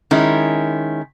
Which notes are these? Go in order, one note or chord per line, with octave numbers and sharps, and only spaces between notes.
D#3 G#3 C#4 E4